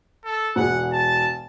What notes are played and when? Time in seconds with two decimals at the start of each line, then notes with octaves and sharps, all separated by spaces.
0.24 A4
0.56 E1 G#4 F#5
0.92 A5